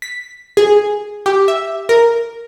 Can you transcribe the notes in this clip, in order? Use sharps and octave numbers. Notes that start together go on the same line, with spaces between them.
B6
G#4
G4
E5
A#4